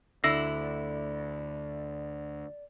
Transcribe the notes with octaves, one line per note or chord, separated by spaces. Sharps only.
D2 D3 E4 D5 E6 A#6 C7